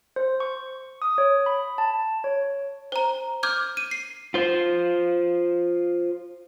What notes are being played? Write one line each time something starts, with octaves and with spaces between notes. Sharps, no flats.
C5
C#6
D#6
C#5
B5
A5
C#5
C5 A#5
D6 F6 G6 G#6
D#7
C7
F4 C5